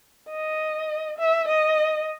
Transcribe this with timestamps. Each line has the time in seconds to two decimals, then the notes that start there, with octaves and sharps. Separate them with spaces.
0.30 D#5
1.18 E5
1.48 D#5